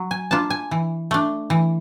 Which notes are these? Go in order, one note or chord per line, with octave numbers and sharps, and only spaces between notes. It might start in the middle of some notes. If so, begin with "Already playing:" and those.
Already playing: F#3
G#5
A#3 D4 F4 A5
G#5
E3
A3 D4
E3